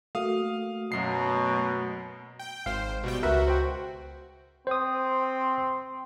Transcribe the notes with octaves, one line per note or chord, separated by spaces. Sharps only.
A3 A#3 F#4 F5 D#6
F#2 B2 F#3 C7
G5
G#1 C5 F5
B2 G3 G5
C#2 F#4 A#4 B4 E5
C5 G5
C4 C5 D#6